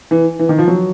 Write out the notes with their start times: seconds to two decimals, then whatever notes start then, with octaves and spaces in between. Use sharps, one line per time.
0.11 E3
0.39 E3
0.49 D#3
0.59 F3
0.68 F#3